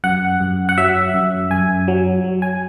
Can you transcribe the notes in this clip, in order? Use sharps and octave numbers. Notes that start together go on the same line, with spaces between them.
F#2 F#5
F#2
F#5
F#3 E5
F#2
F#2 G#5
F#3
F#3
G#5